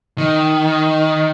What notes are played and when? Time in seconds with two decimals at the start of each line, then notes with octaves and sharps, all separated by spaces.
0.18 D#3